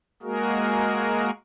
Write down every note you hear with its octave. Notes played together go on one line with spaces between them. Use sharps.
G#3 A#3 F#4 G#4 A#4